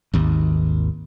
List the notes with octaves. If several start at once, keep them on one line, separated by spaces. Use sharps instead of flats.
G#1 D#2